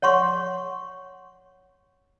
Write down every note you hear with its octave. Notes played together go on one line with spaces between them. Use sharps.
C#5 F#5 C6 C#6